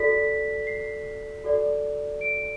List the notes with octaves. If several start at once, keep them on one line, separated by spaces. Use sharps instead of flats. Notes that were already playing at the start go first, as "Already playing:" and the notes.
Already playing: F#4 A4 D5 B6
C7
F#4 A4 D5
D7